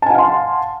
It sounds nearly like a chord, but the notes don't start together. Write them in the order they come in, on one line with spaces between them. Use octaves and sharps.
A5 G#5 F#5 F5 C6